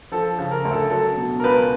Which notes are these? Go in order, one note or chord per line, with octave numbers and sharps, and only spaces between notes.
F3 A4
C#3
A#4
D2
A4
F#3 A4
B2
A#4
C#2 B4